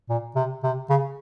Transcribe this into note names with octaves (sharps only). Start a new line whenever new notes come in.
A#2
C3
C3
C#3